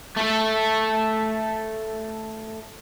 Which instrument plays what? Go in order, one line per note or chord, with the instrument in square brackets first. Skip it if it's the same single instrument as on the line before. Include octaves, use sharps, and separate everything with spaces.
[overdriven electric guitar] A3 A4